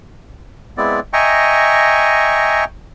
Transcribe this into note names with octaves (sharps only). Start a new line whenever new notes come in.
G#3 B3 C4 E4 D5
D#5 E5 G5 G#5 A#5 C#6